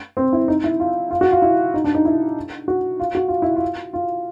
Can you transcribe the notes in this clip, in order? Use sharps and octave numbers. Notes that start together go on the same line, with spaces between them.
C4
E4
D#4
E4
F4
F4
F#4
F4
E4
D#4
D4
D#4
E4
F#4
F4
F#4
F4
E4
F4
F4